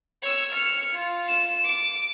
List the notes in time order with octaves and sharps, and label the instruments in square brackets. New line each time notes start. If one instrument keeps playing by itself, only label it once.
[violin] C#5 E6
F6 C#7
F4
E7
D6